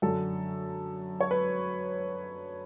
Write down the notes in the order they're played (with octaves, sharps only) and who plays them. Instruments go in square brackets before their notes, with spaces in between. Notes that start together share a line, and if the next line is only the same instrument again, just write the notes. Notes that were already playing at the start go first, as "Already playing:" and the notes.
[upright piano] F#2 D3 F#3 A4
C#5
B4